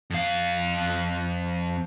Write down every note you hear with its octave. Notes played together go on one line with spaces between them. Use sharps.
F2 F5